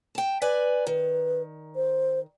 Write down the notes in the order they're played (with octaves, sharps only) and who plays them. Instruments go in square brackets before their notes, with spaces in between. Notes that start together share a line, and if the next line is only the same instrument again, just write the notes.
[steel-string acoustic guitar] G5 A5
B4 D5 G#5
[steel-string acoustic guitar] D#3 [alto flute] B4
[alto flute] C5